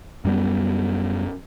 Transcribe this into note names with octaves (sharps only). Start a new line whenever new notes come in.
F#2 G3 B3